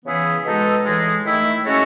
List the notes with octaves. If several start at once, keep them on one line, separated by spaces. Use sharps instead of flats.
C#3 E3 B3 E4 G#4
B2 G#3 D#4 A4
A2 E3 G#3
D#3 A3 E4
G#3 C#4 F#4 A4 C#5